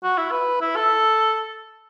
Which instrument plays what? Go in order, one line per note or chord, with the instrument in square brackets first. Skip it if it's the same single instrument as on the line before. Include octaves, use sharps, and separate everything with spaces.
[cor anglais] F#4
E4
B4
E4
A4